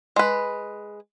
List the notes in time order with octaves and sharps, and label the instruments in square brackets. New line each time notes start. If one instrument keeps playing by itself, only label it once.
[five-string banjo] G#3 B4